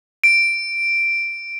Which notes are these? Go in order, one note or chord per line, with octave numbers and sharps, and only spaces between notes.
D7